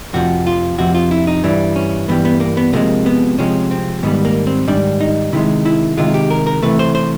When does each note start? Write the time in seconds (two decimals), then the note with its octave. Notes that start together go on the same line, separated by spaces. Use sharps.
0.14 F2 C3 F3 F#4
0.47 F4
0.78 F2 C3 F3 F#4
0.95 F4
1.11 E4
1.27 D#4
1.44 G2 E3 G3 D4
1.76 C#4
2.08 G2 E3 G3 B3
2.25 B3
2.40 A#3
2.57 B3
2.73 C3 F3 G#3 A#3
3.06 B3
3.38 C3 F3 G#3 C#4
3.71 C4
4.03 G#2 D#3 G3 B3
4.25 A#3
4.47 C4
4.67 G#2 D#3 G3 D4
5.00 D#4
5.33 C3 D#3 G#3 E4
5.65 E4
5.97 C3 D#3 G#3 F4
6.14 G4
6.30 A#4
6.47 A#4
6.63 C3 E3 A3 B4
6.79 C5
6.95 C5